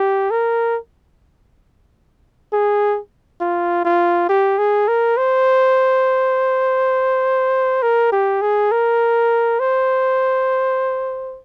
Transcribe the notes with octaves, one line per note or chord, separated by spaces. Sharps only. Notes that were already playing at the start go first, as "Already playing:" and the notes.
Already playing: G4
A#4
G#4
F4
F4
G4
G#4
A#4
C5
A#4
G4
G#4
A#4
C5